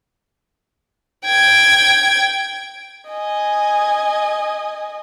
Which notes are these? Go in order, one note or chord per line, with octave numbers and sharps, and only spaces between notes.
G5 G#6
D#5 G#5